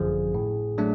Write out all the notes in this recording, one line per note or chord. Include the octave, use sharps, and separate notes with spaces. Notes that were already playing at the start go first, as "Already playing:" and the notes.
Already playing: G#1 F#2 D3 F3 G#4
A2
F#3 A3 D4